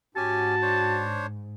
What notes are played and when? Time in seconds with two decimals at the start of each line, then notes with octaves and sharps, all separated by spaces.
0.17 G#2 C#4 F#4 G4 G#5 A5
0.62 D4 C5 C#5